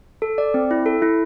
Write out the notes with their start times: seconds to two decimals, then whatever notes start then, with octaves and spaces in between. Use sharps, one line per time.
0.22 A4
0.38 D5
0.54 C4
0.71 E4
0.86 A4
1.02 E4